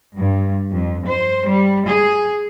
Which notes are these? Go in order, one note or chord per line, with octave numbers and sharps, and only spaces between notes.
G2
F2
C5
G3
G#4